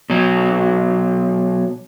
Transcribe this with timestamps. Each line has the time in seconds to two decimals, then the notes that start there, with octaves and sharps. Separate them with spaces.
0.10 B2 F#3